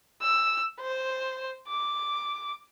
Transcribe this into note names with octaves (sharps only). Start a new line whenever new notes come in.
E6
C5
D6